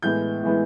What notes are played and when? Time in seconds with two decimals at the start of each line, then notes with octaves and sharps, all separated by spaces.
0.02 A2 E3 G#3 B3 G6
0.43 A2 E3 G#3 B3